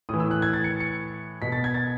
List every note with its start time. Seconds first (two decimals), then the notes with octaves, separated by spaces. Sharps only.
0.09 A2 E3 D#6
0.20 E6
0.31 F#6
0.42 G#6
0.54 A6
0.64 C#7
0.80 C#7
1.42 B2 B6
1.52 A6
1.64 G#6
1.74 A6